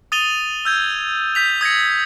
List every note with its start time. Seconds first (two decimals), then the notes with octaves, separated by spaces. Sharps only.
0.12 D#6 A6 D#7 F7 G7
0.65 E6 G6 G#6
1.35 G6 B6 F7
1.61 D#6 G#6 A#6 C#7